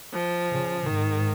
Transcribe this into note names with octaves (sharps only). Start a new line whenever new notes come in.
F3
C#3
G#2 D#3